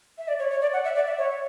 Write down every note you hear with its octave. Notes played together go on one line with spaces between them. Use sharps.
E5
D5
C#5
C#5
D5
F#5
E5
D5
E5
C#5